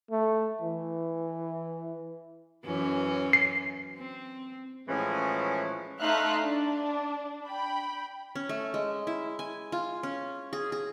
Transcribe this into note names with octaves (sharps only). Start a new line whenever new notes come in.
A3
E3
F#2 E3 C#4
C7
C4
A2 E3 F3 G#3 C#4
A3 D#4 E5 F5 C6 F#6
D4
G5 B5
C#4
A3
G#3
E4
G#5
F4
C#4
G#4
G#4